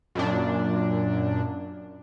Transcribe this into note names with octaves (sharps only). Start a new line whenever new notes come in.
F#2 A#2 D4